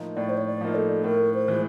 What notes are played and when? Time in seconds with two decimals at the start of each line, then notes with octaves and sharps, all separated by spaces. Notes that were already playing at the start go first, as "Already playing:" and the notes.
Already playing: A2 F3 A#3 D#4
0.16 A2 D5
0.29 C5
0.37 C#5
0.46 D5
0.61 F3 A#3 D#4
0.75 A4
1.04 A2 A#4
1.34 C5
1.48 E3 G#3